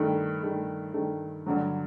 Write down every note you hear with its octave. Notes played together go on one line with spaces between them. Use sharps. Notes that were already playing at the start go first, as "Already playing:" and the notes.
Already playing: G2 D#3 A3
G2 D#3 A3
G2 D#3 A3
G2 D3 F#3